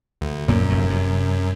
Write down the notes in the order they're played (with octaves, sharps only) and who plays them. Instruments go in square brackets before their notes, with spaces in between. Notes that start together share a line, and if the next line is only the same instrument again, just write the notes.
[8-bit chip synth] D2
[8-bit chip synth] F#2 [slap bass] A#2 A#3
[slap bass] F1 F#3
C3